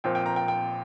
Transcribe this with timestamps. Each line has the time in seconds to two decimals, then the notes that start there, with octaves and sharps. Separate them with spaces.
0.04 A#1 A#2 F3 C4 G5
0.15 G5
0.26 A#5
0.36 G5
0.48 G5